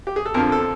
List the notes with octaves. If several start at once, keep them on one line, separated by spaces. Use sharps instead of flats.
G4
G#4
A4
F2 D3 F3 A#4
A4